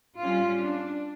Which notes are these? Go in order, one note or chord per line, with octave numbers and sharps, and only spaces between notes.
G3 C#4 F4
D4